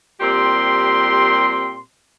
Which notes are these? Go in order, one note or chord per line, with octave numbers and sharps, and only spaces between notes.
A#2 G3 C4 G4 C6